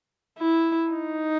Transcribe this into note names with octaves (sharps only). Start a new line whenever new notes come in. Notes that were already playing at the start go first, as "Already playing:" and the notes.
E4
D#4